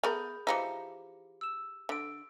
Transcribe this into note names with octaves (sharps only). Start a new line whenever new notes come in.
A3 B3 G#4 A#4 B5 G6
E3 F3 D#4 G4 C#7
E6 E7
D3 E6 D7